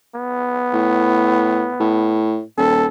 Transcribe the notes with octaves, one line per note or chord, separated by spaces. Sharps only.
B3
A2
A2
D#1 A4